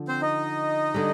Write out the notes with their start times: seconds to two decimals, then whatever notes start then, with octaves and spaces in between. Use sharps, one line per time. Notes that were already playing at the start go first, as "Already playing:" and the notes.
Already playing: D3 F3
0.08 C4 C5
0.22 D#4 D#5
0.94 D3 G3